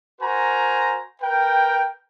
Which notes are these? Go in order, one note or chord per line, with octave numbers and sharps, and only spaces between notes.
F#4 A#4 C5 G#5 A#5
A#4 B4 G5